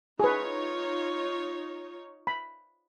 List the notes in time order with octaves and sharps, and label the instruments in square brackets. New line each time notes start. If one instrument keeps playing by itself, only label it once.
[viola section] D#4 F4 C#5 [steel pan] G#4 B4
[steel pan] B5